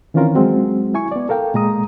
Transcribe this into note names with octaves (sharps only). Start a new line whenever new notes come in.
D#3 E3 C4 C#4 F4 A#4
F#3 G#3 C4 F#4
E4 G#5 C#6
B3 D5
A4 A#4 F5 G5
A#2 G#3 A#5 D#6